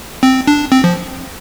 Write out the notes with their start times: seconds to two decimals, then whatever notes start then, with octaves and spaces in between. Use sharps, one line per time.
0.23 C4
0.47 D4
0.72 C4
0.84 F3